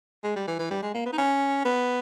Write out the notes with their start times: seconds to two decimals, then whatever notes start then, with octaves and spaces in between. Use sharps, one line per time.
0.24 G#3
0.36 G3
0.48 E3
0.59 E3
0.71 G3
0.83 G#3
0.94 A#3
1.06 B3
1.13 D#4
1.18 C#4
1.65 B3